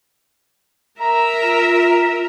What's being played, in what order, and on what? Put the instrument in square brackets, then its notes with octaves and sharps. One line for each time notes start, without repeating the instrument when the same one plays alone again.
[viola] A#4 E5 [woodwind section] A#5
[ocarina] F4